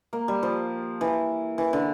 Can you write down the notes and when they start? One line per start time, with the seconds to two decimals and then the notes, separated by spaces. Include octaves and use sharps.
0.13 A#3
0.28 G3
0.43 F3
1.01 E3
1.58 E3
1.73 D3